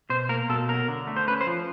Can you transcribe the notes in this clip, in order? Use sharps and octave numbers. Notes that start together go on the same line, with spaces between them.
B2 C5
A#3 A#4
B2 A4
F#3 A#4
D3
A3
C5
C#4 B4
C5
F3